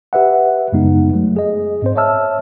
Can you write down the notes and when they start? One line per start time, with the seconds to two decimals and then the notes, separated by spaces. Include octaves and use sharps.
0.13 G4 B4 E5 F#5
0.73 F#2 C#3 G#3 B3 D#4
1.14 F#3 A3
1.37 G#4 D#5
1.82 G#2 C4 C5
1.95 C#5 D#5 E5 A5 E6 F6